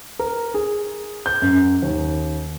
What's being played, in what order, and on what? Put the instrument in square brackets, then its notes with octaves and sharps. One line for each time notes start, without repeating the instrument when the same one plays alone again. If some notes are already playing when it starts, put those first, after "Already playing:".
[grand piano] A#4
G#4
G6
F#2
D#2